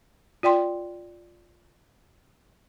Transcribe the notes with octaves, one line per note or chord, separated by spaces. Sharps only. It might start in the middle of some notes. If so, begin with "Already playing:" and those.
F4 D5 G5 C6